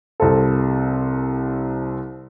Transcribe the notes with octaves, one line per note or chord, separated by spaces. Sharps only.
C2 C4 A4